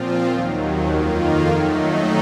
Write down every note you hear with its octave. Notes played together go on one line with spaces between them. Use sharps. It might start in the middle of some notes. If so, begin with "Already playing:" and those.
Already playing: A#2 F3 C4 F4
D#2 D#3 F#3
F2 D#3 A#3 F4
D#3 F#3 A3 D#4